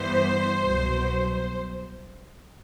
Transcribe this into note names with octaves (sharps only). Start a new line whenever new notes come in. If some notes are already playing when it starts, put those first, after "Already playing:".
Already playing: G2 E3 B3 C5
C2 B2 F#3